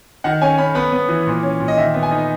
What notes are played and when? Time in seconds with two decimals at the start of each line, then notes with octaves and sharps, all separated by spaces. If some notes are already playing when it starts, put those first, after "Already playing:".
0.24 D#3 F#5
0.41 C#4 G#5
0.58 C#4 B5
0.75 B3 B5
0.93 B3
1.09 E3
1.27 A#2
1.43 C#4
1.60 A#2
1.68 D#5
1.77 D#3 E5
1.94 B3
2.03 G#5
2.11 D#4